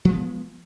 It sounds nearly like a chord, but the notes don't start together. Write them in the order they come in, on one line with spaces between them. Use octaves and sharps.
F3 G#3 B3